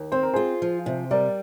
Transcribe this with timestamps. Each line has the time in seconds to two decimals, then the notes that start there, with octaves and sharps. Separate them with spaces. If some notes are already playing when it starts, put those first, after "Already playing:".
Already playing: D#2
0.12 C4 C5
0.23 A#4
0.33 F4 G#4 C5
0.62 F3
0.86 C3
1.11 G3 A#4 D5